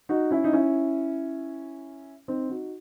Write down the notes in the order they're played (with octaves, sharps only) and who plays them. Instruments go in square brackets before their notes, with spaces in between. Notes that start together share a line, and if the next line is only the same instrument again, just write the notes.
[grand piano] D#4 F#4
C#4 E4
D#4
C#4 E4
C4 D#4
D#4 F#4